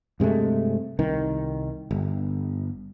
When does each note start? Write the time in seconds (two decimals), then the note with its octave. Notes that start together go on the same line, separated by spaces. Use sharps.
0.20 G2 C3 G#3 A3
0.99 C2 D#3
1.91 G1